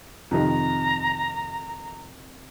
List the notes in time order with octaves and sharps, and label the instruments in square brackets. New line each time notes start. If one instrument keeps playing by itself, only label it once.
[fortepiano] F2 C3 D#3 [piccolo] A#5